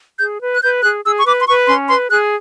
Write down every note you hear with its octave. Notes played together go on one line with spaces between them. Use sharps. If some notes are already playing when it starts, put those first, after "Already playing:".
G#4 G6
B4
F#6
B4 G6
G#4 F#6
G#4 E6
C#6
B4 D6
C6
B4 C#6
C#4 C6
B4 C6
G#4 F#6